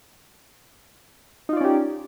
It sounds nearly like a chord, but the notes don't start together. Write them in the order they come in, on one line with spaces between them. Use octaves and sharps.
D#4 F4 D5 C#4 G4